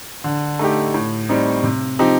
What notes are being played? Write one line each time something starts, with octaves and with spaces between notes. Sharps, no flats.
D3
A3 D#4 G4
A2
G3 C4 D#4
C3
F3 C4 D#4 G4